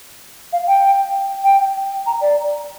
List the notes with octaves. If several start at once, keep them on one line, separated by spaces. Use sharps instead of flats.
F5
G5
G5
A#5
D5